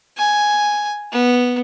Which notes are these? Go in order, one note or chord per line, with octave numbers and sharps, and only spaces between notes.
G#5
B3